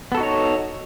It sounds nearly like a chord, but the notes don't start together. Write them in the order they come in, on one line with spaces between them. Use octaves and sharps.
B3 A4 F#4 D#4 C#5